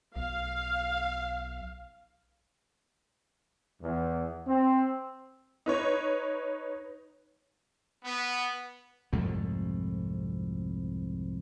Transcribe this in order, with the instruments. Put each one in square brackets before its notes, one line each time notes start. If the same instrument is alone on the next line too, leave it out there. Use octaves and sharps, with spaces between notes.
[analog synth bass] B1 [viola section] F5
[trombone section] E2
C4
[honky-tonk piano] D#4 B4 C#5
[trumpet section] B3
[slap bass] C2 F2 G#2 A3